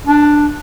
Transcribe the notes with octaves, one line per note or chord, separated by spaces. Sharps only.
D4